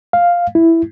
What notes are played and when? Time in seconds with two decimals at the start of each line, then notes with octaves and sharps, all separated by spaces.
0.13 F5
0.55 E4